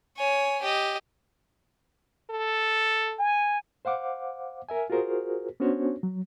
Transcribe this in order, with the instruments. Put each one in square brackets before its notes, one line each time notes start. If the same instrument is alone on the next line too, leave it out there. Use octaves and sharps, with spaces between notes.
[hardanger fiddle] C#5 G#5
G4 D#5
[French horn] A4
[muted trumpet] G#5
[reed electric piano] C5 F5 F#5 D6
A#4 E5 G#5
F4 F#4 G#4 A#4 C5
B3 C#4 D4 F#4 C5 C#5
F#3